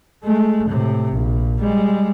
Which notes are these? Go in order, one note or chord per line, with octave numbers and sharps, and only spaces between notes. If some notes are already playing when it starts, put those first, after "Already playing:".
G#3 A3
A2 C3
A#1
G3 G#3